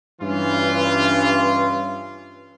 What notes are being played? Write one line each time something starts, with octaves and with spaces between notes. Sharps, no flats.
G2 E3 C#4 F4